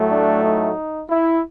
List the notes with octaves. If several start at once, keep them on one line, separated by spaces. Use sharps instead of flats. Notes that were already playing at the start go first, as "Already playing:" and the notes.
Already playing: A2 F#3 A3
D4
D#4
E4